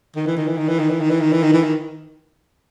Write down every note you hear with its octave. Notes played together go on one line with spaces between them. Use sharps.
D#3
E3
D#3
E3
D#3
E3
D#3
E3
D#3
E3
D#3
E3
D#3
E3
D#3